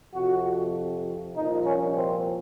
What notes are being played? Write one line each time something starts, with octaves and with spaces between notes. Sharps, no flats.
F2 C3 F3 F#4
C2 A#2 F3 D#4
C#4
C4